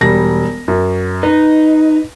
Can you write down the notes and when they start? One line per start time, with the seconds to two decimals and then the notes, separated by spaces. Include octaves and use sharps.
0.01 E1 G3 A#6
0.68 F#2
1.23 D#4 B4